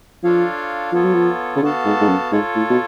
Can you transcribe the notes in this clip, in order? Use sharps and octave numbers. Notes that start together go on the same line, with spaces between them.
F3 D4 F4 A4 C#5 F5
F3 B3 F4 A4 C#5
F#3
F3
C#3
D3 B3 F#4 A4 F5 A5
G#2
G#2
F#2
G#2 F4 A4 C#5
A2
B2